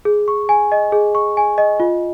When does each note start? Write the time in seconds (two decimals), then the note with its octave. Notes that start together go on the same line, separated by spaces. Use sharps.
0.05 G#4
0.28 C#6
0.49 G#5
0.72 D#5
0.92 G#4
1.15 C#6
1.37 G#5
1.58 D#5
1.80 F4